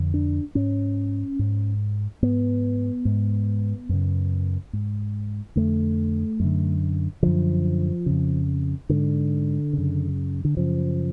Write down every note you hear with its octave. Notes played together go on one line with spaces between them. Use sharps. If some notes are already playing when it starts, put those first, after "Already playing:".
Already playing: F2 D3
D4
G#2 C#4
G#2
G#2 B3
G#2
F#2 C#3
G#2
F2 D3 A3
F#2 D3
F#2 D3 F3
F2 C#3
G#2 D3
F#2 C#3
D3
F#2 C#3 F3